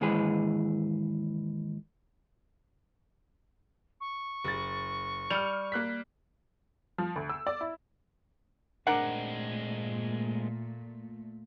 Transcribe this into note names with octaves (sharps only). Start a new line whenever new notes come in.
D#2 G#2 E3 G#3 G#4 B4
C#6
F#1 A6
G3 F6 C#7 F7
A#3 F#6 B6
F3
D2
E6
D5
E4
A#2 G#3 A3 C4 D4 A#4 F#5